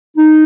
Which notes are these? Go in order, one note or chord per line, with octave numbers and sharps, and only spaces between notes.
D#4